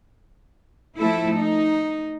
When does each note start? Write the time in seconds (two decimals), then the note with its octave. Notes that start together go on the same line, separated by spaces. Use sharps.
0.97 F3 A3 E4 A4
1.36 D#4